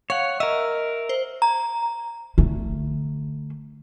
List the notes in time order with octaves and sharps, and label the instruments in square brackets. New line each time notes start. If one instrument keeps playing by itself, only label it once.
[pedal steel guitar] C#5 F#5 [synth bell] F5
[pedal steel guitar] A#4 E5 [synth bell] D#5
[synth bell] C5
A#5
[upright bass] D3 A3